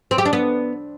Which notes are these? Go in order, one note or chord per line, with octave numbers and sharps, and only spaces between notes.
C4
G4
D4
B3